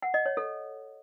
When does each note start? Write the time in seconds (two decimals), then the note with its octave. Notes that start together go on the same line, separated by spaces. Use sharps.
0.02 F#5
0.14 D#5
0.26 C#5
0.37 A4